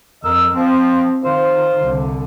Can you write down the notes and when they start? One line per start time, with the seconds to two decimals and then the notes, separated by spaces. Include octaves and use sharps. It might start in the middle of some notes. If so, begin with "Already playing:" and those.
0.23 F2 A#4 D#5 E6
0.54 F3 C4
1.23 D#3 F4 C5
1.84 C2 D3